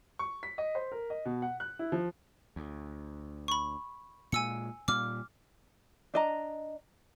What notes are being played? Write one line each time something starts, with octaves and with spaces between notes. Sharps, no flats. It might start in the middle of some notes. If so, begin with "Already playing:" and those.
C#6
B6
D#5
C5
A#4
D#5
B2
F#5
F#6
E4
F3
D2
B5 C#6
A#2 G#3 G#5 E6 C#7
A#2 G3 D6 F6
D4 D#5 A#5